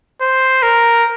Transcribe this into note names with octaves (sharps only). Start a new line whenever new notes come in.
C5
A#4